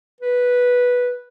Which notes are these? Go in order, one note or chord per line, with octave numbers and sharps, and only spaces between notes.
B4